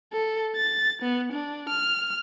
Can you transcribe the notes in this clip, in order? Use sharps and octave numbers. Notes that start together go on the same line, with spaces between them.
A4
A6
B3
D4
F6